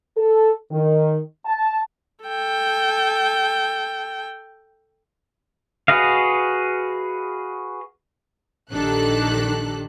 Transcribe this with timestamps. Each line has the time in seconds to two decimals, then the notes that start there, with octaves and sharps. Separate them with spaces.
0.17 A4
0.71 D#3
1.46 A5
2.24 A4 G5
5.88 F#4 G#4 B4 D#5 F5
8.72 A#1 D#3 D4 G4 A4 F#6